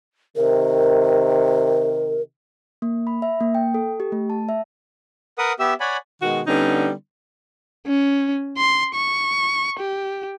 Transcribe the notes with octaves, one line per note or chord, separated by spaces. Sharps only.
C3 D#3 A#4
A#3
B5
E5
A#3
G5
A4
G4
A3
A5
E5
A#4 B4 F#5 D#6
B3 G4 E5 E6
C#5 D5 F#5 G#5 B5
B2 D#3 G#3 F#4
D3 G3 B3 C#4 D#4
C#4
C6
C#6
G4